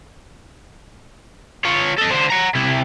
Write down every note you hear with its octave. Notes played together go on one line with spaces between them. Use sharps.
F4 C#5
A4 D#5
D3 C5
F#5 A#5
C3 E4